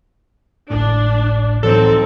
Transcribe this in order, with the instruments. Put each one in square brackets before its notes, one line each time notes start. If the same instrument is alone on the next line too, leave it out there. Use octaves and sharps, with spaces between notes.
[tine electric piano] G#1 C#2 A2 [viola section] D4
[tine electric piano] A2 E3 F#3 [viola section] C4 D#4 [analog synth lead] A4